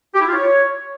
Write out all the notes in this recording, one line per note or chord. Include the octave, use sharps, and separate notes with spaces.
G4
E4
F4
C#5